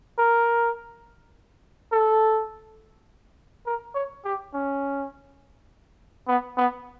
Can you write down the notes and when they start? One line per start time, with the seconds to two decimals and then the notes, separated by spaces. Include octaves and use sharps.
0.18 A#4
1.92 A4
3.66 A#4
3.95 C#5
4.25 G4
4.54 C#4
6.28 B3
6.57 B3